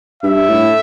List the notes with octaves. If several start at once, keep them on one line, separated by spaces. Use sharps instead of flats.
G2 E5
A2